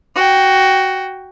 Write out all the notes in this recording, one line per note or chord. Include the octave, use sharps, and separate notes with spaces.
F#4 G5